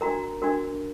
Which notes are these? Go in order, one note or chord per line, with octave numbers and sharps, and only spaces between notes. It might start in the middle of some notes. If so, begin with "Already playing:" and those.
D4 F#4 A#4 A#5
D4 F#4 A#4